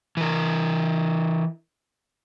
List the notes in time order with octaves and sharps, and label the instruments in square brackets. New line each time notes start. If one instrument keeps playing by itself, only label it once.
[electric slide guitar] E3 A#4